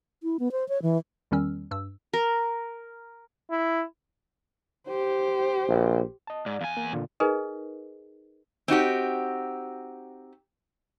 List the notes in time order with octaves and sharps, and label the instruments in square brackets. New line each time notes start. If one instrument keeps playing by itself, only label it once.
[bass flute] E4
B3
C5
C#5
E3
[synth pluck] E2 D#3 G3 C#4 E6 F6
G2 E6
[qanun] A#4
[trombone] E4
[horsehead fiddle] G4 C5
[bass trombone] A#1
[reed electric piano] D#5 A5
[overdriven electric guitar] G#2 [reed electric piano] D5
[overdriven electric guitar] E2 G#5 [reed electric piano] F5
[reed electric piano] A#3
A#2 D3 F4
[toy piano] D#4 G#4 A#4 B4 D#5
[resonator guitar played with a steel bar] C4 D#4 F#4 G4